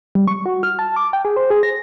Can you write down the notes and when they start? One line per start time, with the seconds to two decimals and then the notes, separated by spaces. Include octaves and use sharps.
0.15 G3
0.28 C#6
0.46 F#4
0.63 F6
0.79 A5
0.96 D6
1.13 G5
1.25 G#4
1.36 C5
1.50 G#4
1.63 A#6